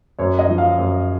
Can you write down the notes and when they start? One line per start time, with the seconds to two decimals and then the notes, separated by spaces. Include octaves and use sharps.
0.19 F#2 C#5
0.39 D#5
0.48 F3
0.58 F5
0.78 F#2